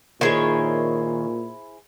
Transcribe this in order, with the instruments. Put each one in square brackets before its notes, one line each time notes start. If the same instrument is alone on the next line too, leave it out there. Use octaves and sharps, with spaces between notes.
[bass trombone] A#2 [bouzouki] D#3 C#5 [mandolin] E4 G#4 C5